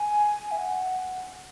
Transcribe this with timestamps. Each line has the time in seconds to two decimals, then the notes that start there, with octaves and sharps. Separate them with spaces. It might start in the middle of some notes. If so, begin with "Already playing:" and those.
Already playing: G#5
0.51 E5
0.59 F#5